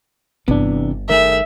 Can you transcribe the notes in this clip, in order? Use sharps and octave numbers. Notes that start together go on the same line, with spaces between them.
G1 C3 E3 B3 D4
D#3 A3 G#4 A#4 E5